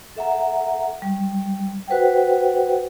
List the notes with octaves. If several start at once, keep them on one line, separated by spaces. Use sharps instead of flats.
A4 E5 F#5 A#5
G3
F#4 B4 C5 F#5 G5